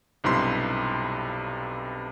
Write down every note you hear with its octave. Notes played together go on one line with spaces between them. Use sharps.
B1 G2 C3 E4 B5 C6